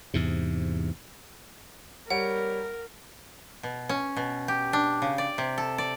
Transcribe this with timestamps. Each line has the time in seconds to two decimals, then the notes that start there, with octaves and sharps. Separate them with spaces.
0.14 E2 G#2 C3
2.10 G3 A#4 C#5 F#5 D7
3.63 B2
3.89 C#4
4.17 B2
4.48 G4
4.73 D4
5.02 C#3
5.18 D5
5.38 C3
5.58 A4
5.78 D5